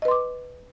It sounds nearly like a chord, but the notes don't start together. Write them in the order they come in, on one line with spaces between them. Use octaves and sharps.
D#5 B4 C6 D6